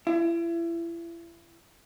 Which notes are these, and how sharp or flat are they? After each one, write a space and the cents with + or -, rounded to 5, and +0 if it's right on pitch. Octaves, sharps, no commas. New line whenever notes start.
E4 +35